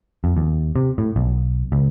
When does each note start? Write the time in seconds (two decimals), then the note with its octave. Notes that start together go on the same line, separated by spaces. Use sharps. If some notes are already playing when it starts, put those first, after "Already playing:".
0.24 F2
0.37 D#2
0.76 C3
0.98 A2
1.16 B1
1.72 C#2